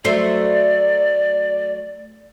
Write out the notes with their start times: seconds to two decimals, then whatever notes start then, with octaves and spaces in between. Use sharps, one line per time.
0.05 F#3 A3 C5 D5